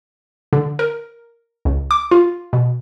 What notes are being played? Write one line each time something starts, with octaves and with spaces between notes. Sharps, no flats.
D3
A#4
C#2
D6
F4
B2